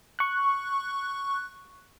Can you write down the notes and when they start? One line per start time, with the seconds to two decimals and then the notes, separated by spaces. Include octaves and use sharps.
0.19 C#6 F#6